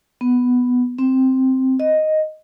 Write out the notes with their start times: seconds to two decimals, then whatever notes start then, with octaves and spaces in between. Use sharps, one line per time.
0.21 B3
0.99 C4
1.80 D#5